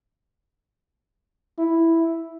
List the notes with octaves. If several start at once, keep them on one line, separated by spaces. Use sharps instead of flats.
E4